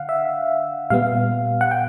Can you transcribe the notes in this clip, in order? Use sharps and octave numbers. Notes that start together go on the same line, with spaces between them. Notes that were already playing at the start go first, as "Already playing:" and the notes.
Already playing: D3 F5 F#5
E5
A#2 G3 B3 F5
F#5
G5